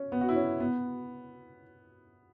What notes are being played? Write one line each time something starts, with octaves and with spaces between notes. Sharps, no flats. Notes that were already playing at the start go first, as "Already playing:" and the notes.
Already playing: C#4
B3
F#4
E4
C#4
B3